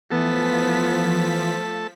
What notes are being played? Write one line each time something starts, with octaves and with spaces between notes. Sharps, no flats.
E3 F3 A3 B3 A4 A5 B6